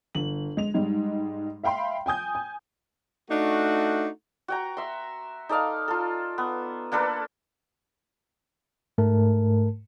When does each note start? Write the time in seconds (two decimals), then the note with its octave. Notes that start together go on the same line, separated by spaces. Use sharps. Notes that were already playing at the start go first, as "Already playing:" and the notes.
0.15 G1 F#7
0.57 G#3 F7
0.74 G#2 G3 G#3
1.63 E5 F5 G5 B5 C6
2.06 G5 G#5 D#6 G6
2.35 G#5
3.30 A3 D4 D#4 F#4
4.48 F#4 G5 A#5
4.77 E5 C6
5.49 D#4 A4 D5 F5
5.88 F4 A4
6.38 B3
6.92 A#3 D4 A4 B4
8.98 G#2 A3 A#4 A5